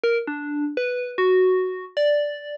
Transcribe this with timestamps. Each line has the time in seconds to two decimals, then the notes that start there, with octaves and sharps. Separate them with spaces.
0.04 A#4
0.27 D4
0.77 B4
1.18 F#4
1.97 D5